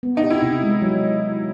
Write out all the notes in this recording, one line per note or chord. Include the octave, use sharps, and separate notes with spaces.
B3
D#4
G4
E4
C3
G#3
F#3